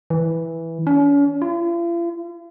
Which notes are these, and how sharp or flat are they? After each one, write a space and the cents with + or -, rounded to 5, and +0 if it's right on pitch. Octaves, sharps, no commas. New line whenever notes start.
E3 -5
C#4 +40
F4 -45